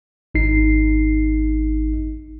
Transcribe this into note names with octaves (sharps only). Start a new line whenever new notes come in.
G#1 D#4 C7